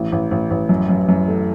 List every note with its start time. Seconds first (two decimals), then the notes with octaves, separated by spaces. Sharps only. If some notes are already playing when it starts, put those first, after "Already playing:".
Already playing: A1
0.12 A1
0.31 A1
0.51 A1
0.69 F#2
0.89 F#2
1.09 F#2
1.28 A3